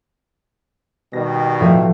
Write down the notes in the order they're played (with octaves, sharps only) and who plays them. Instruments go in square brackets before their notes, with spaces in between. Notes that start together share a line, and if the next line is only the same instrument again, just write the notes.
[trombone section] B2 D#3 G3 [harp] A#6
[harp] A2 F3 A3